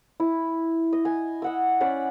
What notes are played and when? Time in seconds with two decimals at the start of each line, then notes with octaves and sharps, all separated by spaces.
0.20 E4
0.93 D#5
1.05 G#5
1.42 D#5 F#5 E6
1.81 C#4 D5 F#5 B5